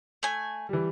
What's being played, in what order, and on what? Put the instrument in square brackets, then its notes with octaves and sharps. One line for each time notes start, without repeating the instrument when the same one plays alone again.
[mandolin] A3 G#5
[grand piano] E3 G3